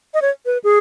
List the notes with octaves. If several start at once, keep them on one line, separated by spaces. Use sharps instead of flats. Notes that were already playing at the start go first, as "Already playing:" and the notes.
D#5
C#5
B4
G#4